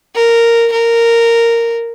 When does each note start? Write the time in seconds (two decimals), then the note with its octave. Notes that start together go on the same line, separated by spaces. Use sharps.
0.16 A#4
0.72 A#4